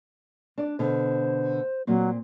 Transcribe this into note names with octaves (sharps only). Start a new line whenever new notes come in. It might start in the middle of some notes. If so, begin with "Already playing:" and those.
D4 D5
B2 D3 C5
A#2 F#3 C4